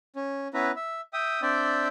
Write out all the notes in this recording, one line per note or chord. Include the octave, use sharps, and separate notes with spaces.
C#4
B3 C#4 E4 B4 A#5
E5
E5 G5 D#6
C4 D4 D5 E5 G5